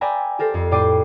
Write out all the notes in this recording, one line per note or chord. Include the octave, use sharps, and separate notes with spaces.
B4 D5 E5 G5 G#5 A#5
G4 A4 A#4 C5
F2
A2 D5 G5 D6 C7 D#7